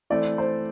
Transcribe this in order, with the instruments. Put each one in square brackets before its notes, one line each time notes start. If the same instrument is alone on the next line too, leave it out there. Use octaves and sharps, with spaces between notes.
[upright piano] E3 A3 C4 [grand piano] D5
[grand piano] C5